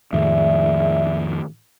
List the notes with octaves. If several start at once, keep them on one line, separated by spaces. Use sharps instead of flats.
F2 A2 D#3 G#3 D5 E5